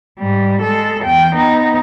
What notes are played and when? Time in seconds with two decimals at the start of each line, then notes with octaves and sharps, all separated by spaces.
0.19 G#2 G3
0.62 G#3 A4
1.05 E2 G5
1.36 B3 D#4